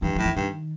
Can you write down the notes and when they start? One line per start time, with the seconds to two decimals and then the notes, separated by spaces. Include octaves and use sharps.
0.02 G2 E3
0.16 A2 F#3
0.25 E3
0.36 G2 D#3